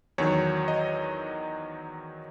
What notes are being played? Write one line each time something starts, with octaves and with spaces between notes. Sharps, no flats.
E2 D#3 F#3 C#5
D#5